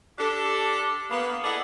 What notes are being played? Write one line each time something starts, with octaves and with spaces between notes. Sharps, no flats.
D4 G4 A4
A#3 B3
E4 G#4 A4 D5 D#5 F#5